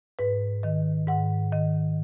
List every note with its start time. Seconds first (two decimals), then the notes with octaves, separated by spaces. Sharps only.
0.19 G#2 B4
0.63 D#3 D#5
1.07 G#2 F#5
1.52 D#3 D#5